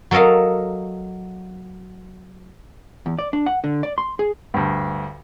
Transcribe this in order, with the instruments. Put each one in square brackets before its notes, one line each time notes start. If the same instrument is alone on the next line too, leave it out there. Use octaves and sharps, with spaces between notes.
[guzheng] F#3 A4 A#4 D#5 F5
[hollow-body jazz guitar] E2
D5
D4
F#5
D3
D5
C6
G#4
[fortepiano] D2 G2